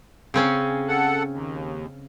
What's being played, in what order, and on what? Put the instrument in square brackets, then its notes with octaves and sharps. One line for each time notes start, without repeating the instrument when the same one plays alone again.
[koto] C#3 C4 C#4
[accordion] A4 F#5
D#2